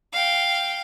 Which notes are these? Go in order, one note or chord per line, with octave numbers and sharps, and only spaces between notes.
F5 G5